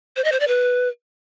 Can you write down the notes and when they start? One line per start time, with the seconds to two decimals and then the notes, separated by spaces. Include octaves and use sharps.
0.16 C5
0.24 D#5
0.32 C5
0.40 D5
0.48 B4